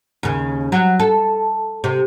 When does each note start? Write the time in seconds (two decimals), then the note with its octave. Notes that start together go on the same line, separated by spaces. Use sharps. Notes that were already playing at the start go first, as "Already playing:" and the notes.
0.23 D#2 C#3
0.72 F#3
1.00 A4
1.84 C3